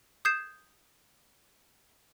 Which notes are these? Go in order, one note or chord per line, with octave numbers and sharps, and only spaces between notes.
D#6 G6 G#6 C7 E7